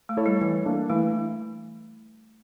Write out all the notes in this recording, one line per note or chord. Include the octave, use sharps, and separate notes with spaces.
A3
E4 A4 C#5
G3
E3
A#3 D4 A4
E3 A3